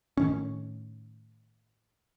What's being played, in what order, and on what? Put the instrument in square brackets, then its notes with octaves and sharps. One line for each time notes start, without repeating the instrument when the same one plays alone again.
[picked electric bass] A2 D#3 C#4